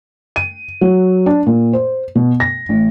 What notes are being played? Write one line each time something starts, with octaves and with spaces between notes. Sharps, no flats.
D#7
F#3
D4
A#2
C5
B2
A#6
A1